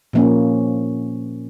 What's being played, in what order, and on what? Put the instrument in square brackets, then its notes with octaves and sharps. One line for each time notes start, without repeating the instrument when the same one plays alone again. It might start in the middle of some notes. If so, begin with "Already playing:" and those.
[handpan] A#2 F3 A#3 C#4